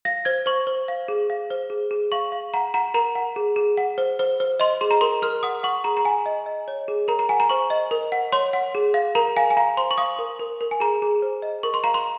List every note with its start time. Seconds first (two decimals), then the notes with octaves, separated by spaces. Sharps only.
0.05 F5 A#6
0.25 C5 G#6
0.46 C5 C#6
0.67 C5
0.88 F5
1.08 G#4
1.30 F5
1.50 C5
1.70 G#4
1.91 G#4
2.12 F5 C#6
2.32 F5
2.54 F#5 A#5
2.74 F#5 A#5
2.94 A#4 A#5
3.15 F#5
3.36 G#4
3.56 G#4
3.77 F#5
3.98 C5
4.19 C5
4.40 C5
4.60 D#5 C6
4.81 G#4 C6
4.91 A#5
5.01 A#4 C6
5.22 A#4 F6
5.43 F#5 D#6
5.63 F#5 C#6
5.84 G#4 A#5
5.97 A#5
6.05 F#5 G#5
6.26 D#5
6.46 D#5
6.68 C#5
6.88 G#4
7.08 A#4 A#5
7.19 A#5
7.29 F#5 G#5
7.40 A#5
7.49 C5 C#6
7.70 D#5
7.91 A#4
8.12 F#5
8.32 C#5 C6
8.53 F#5
8.75 G#4
8.94 F5
9.15 A#4 A#5
9.37 F5 G#5
9.50 G#5
9.57 F5 A#5
9.77 C5 C6
9.91 C#6
9.98 F5 D#6
10.19 A#4
10.39 A#4
10.60 A#4
10.71 G#5
10.80 G#4 A#5
11.02 G#4
11.22 C5
11.42 D#5
11.63 A#4 C#6
11.74 C6
11.84 F5 A#5
11.94 C6